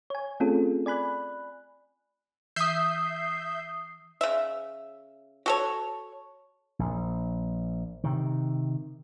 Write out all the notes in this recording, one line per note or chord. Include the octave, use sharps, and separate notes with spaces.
C#5 G#5
A3 C4 C#4 F4 G#4 A4
D5 G#5 B5 F#6
E3 E5 D#6 G6 C7
C#3 E5
F#4 A4 C#5
A#1
C3 D#3